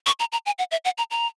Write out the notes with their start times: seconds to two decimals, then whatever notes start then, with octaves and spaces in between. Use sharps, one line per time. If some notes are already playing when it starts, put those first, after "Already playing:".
0.06 C#6
0.20 A#5
0.32 A#5
0.46 G#5
0.59 F#5
0.71 E5
0.85 F#5
0.98 A#5
1.11 A#5